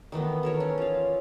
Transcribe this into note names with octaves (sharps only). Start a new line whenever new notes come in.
D#3 E3 A3 B3
A4 A#4 C#5
C#4
F4 F5